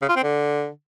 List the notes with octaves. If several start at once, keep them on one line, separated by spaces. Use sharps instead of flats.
C#3
F4
C4
D3